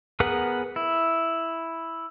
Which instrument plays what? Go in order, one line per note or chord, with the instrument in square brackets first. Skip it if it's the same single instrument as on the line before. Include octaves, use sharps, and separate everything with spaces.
[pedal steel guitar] B3 G#4 A#4 B4 F#5
E4